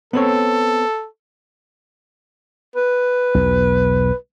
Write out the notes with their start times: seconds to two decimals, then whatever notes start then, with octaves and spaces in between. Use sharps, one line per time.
0.13 B3 C4 A4 C#5
2.76 B4
3.35 B1 E2